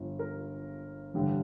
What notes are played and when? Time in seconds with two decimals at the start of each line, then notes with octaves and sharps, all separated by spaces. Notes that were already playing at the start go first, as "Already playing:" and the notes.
Already playing: G1 G2 F3
0.19 A#4
1.14 A1 G2 D3 G3